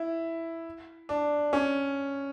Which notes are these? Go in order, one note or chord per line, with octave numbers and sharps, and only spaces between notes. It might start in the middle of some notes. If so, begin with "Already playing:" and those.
Already playing: E4
D4
C#4